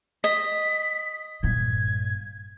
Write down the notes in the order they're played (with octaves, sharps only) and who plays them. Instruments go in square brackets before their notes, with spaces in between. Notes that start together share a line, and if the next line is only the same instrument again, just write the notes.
[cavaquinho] D#5 [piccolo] B6
[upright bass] G2 A#2 [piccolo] G#6